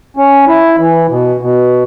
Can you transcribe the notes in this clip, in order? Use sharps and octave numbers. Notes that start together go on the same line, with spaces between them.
C#4
E4
E3
B2
B2